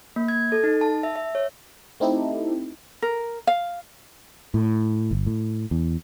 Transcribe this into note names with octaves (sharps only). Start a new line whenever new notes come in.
A#3
G#6
A4
D#4
A5
E5
E5
C#5
A3 C4 D#4 E4 G4 A4
A#4
F5
A2
G1
A2
E2